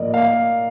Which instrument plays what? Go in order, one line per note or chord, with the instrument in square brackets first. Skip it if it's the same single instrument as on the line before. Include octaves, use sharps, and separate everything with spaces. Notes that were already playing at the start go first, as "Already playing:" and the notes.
Already playing: [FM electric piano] A2 F3 A#3 [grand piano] A#4 D5 D#5
[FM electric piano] A#3 [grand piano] F5